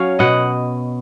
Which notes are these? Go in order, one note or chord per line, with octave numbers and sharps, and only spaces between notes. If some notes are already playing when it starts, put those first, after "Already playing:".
Already playing: F#3 C#4 C#5 F5
B2 D#5 F#5